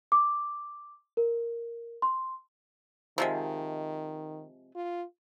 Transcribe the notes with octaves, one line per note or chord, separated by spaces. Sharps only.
D6
A#4
C6
C3 D#3 F3 G#3
F4